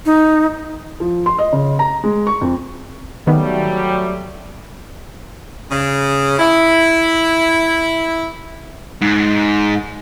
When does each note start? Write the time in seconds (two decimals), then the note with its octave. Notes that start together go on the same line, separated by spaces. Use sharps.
0.05 D#4
1.00 F3
1.26 C6
1.38 D#5
1.52 C#3
1.79 A#5
2.04 G#3
2.27 C#6
2.41 F2
3.27 D#3 F#3 G3 A3 B3
5.71 C#3
6.38 E4
9.01 G#2